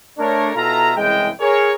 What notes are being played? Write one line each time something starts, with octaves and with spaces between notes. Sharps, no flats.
A3 D4 A#4 C#5
B2 E4 F4 A4 E5 A#5
C2 C#3 E3 G#3 G5
G#4 A#4 C#5